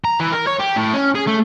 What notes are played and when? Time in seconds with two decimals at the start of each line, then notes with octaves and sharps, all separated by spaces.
0.05 A#5
0.20 E3
0.32 A#4
0.47 C#5
0.60 G4
0.77 A2
0.94 C#4
1.15 G#4
1.27 A3